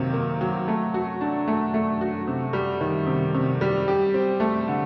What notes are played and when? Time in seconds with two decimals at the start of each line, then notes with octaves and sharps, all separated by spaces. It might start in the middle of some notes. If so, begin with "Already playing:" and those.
Already playing: C3 D#3 F#3 A#3
0.14 A#3
0.41 F#3
0.68 A3
0.94 F#4
1.21 D4
1.47 A3
1.74 A3
2.01 F#4
2.27 C3
2.53 G3
2.81 D#3
3.07 C3
3.34 C3
3.61 G3
3.88 G4
4.14 C4
4.40 A3
4.68 D3